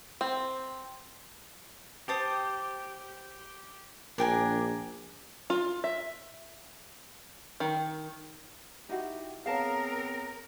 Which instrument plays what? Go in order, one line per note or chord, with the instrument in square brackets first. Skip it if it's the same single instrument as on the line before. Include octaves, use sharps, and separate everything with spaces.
[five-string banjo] C4
[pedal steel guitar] G4 [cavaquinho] C5 A5 D#6
[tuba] A#1 [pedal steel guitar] D4 [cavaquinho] A#4 G5 G#5
[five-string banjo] F4
E5
D#3
[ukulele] D#4 E4 F#4 [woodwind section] G4
[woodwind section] B3 C4 [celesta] G#4 B4 C#5 [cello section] A#4 [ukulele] F5 A5